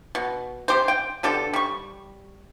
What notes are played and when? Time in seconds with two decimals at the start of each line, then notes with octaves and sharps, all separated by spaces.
0.15 B2
0.68 C3 G4 C5
0.88 G5
1.23 B2 D3 G4 A4
1.53 G3 C#6